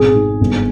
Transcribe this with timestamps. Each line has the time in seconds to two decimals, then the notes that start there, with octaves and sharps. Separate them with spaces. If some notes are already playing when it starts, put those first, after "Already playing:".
Already playing: G#1 B2 G#4
0.14 G#2
0.41 G1